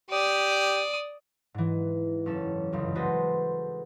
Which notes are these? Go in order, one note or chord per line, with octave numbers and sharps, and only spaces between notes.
G4 D5 D#6
G#2 E3
F#1 C#4 A4 E7
G1 C#2 F#2
G#3 F#4 A4 B4 C5